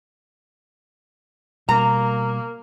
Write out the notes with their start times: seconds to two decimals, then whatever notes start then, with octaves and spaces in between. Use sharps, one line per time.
1.69 B2 G3 A#3 A#5